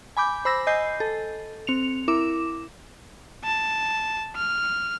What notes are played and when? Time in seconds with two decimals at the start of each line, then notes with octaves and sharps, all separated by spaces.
0.17 G#5 B5 D6 G6
0.45 C5 B5 E6 A#6
0.67 D#5 G#5 G6 C7
1.00 A4
1.67 C4 C#7 F7
2.08 E4 A#4 D6 E7
3.44 A5
4.36 F6